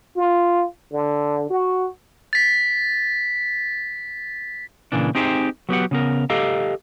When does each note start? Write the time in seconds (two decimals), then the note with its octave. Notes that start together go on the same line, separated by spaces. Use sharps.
0.16 F4
0.93 D3
1.50 F#4
2.33 A6 B6
4.92 A#2 C#3 E3 D4
5.15 C4 D#4 G4 G#4 C5
5.69 F#3 B3 G4 F#5
5.91 C#3 B3 A#4
6.30 G4 A4 D#5 F5 A#5